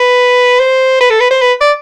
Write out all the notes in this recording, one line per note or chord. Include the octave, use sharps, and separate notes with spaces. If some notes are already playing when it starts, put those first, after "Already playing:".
Already playing: B4
C5
B4
A4
B4
C5
B4
D5